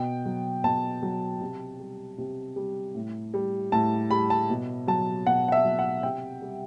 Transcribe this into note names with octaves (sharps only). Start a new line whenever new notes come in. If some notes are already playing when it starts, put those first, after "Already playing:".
Already playing: B2 G5
F#3
B2 A5
F#3
C3
G3
C3
G3
A2
G3
A2 A5
G3 B5
A5
B2
F#3 A5
B2 F#5
F#5
E5
F#3
F#5
C3 G5
G3